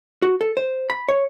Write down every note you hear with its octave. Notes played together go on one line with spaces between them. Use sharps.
F#4
A4
C5
B5
C#5